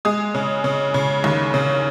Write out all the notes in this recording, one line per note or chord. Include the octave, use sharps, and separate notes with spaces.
G#3 D#6
C#3
C#3
C#3
D#2
C#3